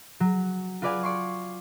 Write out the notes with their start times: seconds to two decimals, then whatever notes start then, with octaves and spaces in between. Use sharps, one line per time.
0.20 F#3
0.82 F4 F#4 B4 D5 F5 G#5
1.03 D5 C6 C#6